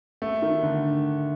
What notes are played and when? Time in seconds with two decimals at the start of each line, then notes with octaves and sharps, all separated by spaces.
0.22 A3
0.42 D#3
0.63 D3